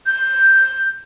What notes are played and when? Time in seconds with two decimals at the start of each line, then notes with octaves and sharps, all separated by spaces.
0.06 G6